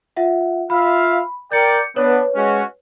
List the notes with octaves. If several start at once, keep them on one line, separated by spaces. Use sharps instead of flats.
F4 E5 F#5
F4 E5 F5 B5
A#4 D5 G5 G6 C#7
B3 D4 B4 C#5
G#3 C#4 F#4